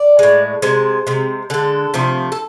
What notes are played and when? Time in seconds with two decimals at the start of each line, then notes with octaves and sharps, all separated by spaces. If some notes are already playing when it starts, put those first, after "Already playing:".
Already playing: D5
0.19 A2 G#3
0.62 C3 G#3 C5
1.07 C3 G#3
1.50 D3 G#3 A4
1.94 C3 F3 A3
2.32 A4